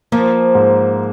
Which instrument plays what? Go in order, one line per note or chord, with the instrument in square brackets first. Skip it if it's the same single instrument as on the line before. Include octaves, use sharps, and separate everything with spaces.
[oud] F3 [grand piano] A#3
[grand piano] G#2